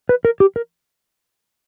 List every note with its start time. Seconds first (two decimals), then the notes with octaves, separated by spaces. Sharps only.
0.09 B4
0.25 A#4
0.40 G4
0.56 A#4